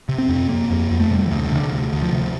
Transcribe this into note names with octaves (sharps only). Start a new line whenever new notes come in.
C3
C4
F2
F2 A#3
F2
F2
A3
C3 G3
E3
D2
C3
D3
D2
D2
F3
C3